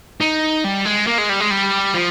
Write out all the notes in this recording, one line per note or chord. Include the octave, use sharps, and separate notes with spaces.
D#4
G3
G#3
A#3
G#3
G3
G#3
G3
F3